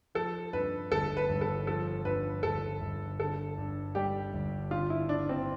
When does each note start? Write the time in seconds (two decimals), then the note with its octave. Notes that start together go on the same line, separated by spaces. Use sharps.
0.15 F3 A4
0.53 G2 B4
0.91 G1 A4
1.17 B4
1.29 G1
1.41 A4
1.67 F3 A4
2.05 G2 B4
2.43 G1 A4
2.81 G1
3.19 D3 A4
3.58 G2
3.95 G3 G4
4.33 G1
4.71 D3 F4
4.90 E4
5.09 G2 D4
5.29 C4